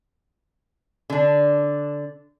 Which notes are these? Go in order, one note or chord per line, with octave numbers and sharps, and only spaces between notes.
D3 D4